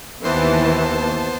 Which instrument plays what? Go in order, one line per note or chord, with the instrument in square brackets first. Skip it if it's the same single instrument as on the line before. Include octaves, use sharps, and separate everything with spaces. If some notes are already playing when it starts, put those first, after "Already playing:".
[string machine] D#2 A5 [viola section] E3 [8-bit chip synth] B3 C5 C7